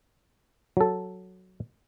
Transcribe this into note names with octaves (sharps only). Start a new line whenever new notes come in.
F#3 A4